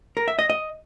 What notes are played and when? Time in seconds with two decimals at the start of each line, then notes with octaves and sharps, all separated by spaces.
0.17 A#4
0.28 E5
0.39 D#5
0.50 D#5